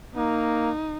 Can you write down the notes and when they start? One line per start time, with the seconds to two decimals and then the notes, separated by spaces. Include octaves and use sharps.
0.15 A#3 D#4